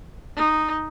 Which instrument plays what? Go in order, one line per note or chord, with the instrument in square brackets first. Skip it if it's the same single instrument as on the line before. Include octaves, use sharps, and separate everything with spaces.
[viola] D#4